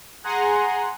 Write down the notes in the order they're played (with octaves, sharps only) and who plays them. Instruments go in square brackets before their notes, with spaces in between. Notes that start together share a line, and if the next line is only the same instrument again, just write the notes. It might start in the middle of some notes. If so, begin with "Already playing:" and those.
[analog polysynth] G#4 F#5 G#5 A#5 C6